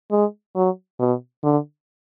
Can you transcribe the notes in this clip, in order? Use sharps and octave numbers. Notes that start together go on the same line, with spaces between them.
G#3
F#3
B2
D3